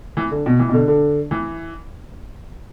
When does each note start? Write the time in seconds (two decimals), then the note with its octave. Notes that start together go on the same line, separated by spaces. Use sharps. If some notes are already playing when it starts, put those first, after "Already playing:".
0.17 E3
0.31 D3
0.46 B2
0.59 E3
0.69 B2
0.74 D3
0.88 D3
1.31 E3